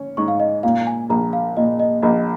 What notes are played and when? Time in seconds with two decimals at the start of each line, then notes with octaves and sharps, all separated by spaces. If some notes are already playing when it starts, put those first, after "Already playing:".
Already playing: C#4
0.17 G#2 C#6
0.28 F5
0.40 D#5
0.63 A#2 F5
0.87 G#5
1.09 A#1 A#5
1.33 F5
1.57 A#2 D#5
1.80 D#5
2.02 A#1 D#5